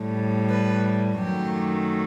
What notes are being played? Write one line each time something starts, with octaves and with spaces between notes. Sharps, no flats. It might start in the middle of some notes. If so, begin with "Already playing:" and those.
Already playing: A2 G3
B4
F#2 D#3 F#3 A3 G4